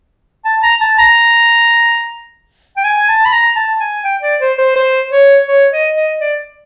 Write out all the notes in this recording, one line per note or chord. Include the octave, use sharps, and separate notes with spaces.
A5
A#5
A5
A#5
G5
G#5
A5
B5
A#5
A5
G#5
G5
D5
C5
C5
C5
C#5
C#5
D#5
D#5
D5